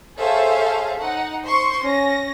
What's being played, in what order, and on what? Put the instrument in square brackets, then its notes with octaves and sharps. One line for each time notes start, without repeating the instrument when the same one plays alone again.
[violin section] G#4 A4 C5 C#5 E5 F5
D#4 F#5
C5 C6 C#6
C#4 A#6